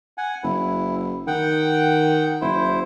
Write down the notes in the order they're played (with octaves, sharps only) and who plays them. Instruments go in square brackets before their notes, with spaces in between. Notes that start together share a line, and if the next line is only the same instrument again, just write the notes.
[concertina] F#5 G#5
[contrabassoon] F#1 [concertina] E4
[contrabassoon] D#3 [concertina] F#5 G5
[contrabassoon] F#1 [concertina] E4 C5